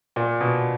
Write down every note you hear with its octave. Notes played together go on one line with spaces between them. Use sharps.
A#2
B2